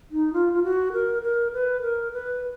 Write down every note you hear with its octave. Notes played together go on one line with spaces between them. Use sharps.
D#4
F4
F4
F#4
A#4
A#4
B4
A#4
B4